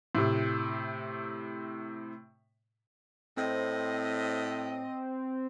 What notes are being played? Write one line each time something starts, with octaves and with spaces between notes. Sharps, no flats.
A2 C3
A2 C4 D#5